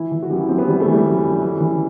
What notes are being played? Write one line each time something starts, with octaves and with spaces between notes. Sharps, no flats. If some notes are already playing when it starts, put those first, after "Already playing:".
Already playing: E3 E4
E3
F#4
F#2 G4
E4
F#2 C4
B3
E3 G3
A3
E3
G3
F#2
F#2
E3
E3